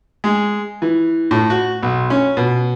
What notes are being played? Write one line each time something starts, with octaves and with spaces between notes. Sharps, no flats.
G#3
E3
A2
F#4
B1
C#4
B2